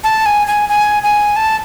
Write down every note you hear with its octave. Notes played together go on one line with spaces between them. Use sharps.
A5
G#5
G#5
G#5
G#5
A5